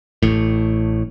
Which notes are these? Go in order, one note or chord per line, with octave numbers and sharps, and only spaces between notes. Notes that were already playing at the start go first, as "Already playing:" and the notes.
A1 A2